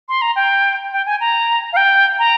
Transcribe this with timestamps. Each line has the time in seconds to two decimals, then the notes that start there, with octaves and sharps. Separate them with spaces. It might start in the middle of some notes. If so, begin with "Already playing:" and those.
0.09 C6
0.21 A#5
0.36 G5
0.93 G5
1.06 G#5
1.20 A#5
1.73 F5
1.76 G5
2.19 A#5